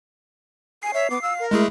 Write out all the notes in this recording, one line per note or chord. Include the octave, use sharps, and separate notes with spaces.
G#5 C7
C#5 E5
B3 D6
F5 E6
A#4
G#3 A3 E4 G#4